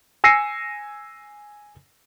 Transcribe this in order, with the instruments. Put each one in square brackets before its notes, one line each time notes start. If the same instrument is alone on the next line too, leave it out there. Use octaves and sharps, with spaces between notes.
[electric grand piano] G#5 E6 A#6 C7 C#7 D#7